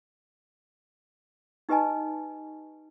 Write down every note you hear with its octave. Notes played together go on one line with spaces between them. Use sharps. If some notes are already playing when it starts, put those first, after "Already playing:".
D#4 G4 B4 D#5 G#5 A5